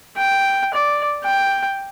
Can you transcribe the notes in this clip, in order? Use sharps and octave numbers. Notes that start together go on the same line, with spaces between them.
G5
D5
G5